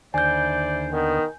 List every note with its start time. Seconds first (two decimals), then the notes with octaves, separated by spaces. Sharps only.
0.14 D#2 D3 E4 C5 D5 G#5 G6
0.92 D#3 B3